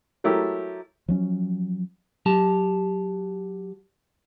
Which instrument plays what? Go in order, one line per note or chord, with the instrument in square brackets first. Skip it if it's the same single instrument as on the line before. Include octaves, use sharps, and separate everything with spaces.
[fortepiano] F#3 A3 E4 G4 A#4
[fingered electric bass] F3 F#3 C#4
[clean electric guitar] F#3 G4 A5